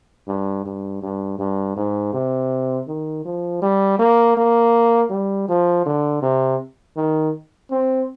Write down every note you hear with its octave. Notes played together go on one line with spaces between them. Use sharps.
G2
G2
G2
G2
G#2
C3
D#3
F3
G3
A#3
A#3
G3
F3
D3
C3
D#3
C4